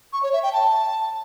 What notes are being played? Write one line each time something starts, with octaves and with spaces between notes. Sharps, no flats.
C#6
C#5
E5
G5
A5